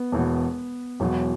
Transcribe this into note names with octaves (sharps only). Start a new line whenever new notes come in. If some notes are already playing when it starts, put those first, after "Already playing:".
Already playing: B3
E1 E2 B2
E1 E2 B2 F#3